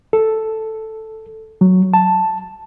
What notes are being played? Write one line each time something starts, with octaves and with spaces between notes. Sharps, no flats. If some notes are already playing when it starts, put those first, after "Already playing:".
A4
F#3
A5